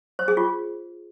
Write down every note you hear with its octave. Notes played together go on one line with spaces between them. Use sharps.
C5
G#4
F4